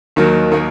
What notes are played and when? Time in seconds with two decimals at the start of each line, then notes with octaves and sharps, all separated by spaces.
0.16 D#2 D#3 F#3 A#3
0.52 D#3 F#3 A#3